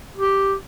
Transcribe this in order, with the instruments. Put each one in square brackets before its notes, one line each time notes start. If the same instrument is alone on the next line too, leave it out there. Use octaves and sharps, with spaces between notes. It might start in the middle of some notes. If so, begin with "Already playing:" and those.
[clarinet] G4